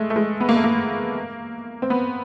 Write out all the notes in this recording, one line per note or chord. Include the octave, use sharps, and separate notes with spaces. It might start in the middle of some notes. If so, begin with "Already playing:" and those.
Already playing: G#3 A3
A3
G#3
B3
A#3
A3
A#3
C4
B3